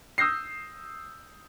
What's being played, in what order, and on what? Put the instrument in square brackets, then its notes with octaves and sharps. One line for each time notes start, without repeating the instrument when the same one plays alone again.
[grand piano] D#6 E6 G6 A#6 C7